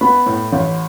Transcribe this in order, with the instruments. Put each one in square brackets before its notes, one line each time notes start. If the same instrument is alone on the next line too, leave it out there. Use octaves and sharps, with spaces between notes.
[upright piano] B3 B5
A2
A1